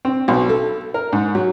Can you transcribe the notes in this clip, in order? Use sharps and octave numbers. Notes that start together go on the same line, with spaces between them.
C4
B1
A4
A#4
G#2
F#3